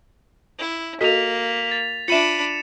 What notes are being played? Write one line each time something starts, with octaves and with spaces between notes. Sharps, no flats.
E4
A#3 F#4 A4 D#5 B6 F7
A6
D4 F4 E5 B5 C#7 D#7 E7